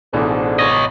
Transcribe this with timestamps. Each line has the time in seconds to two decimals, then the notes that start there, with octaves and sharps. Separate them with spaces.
0.13 A1 F2 G#2 B2 D3 E3
0.59 C#5 D#5